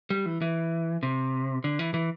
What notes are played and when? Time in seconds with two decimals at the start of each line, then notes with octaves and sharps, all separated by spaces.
0.10 G3
0.26 E3
0.41 E3
1.03 C3
1.64 D3
1.79 E3
1.94 E3